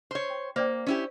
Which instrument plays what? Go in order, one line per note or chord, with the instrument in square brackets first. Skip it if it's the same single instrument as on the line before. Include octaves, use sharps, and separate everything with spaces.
[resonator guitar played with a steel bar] C5 C#5
[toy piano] G5
[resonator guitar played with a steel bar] A#3 [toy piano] C5 D5 G5
[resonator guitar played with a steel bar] C#4 E4 G4